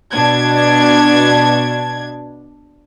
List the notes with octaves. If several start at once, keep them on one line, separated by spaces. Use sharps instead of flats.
B2 D4 G#6